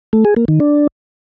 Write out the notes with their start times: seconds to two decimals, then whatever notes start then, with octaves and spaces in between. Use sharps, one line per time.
0.13 A3
0.25 G#4
0.36 A#3
0.48 D#3
0.60 D4